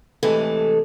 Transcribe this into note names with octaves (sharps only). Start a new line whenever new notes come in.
A2 C3 E3 G#3 A3 A4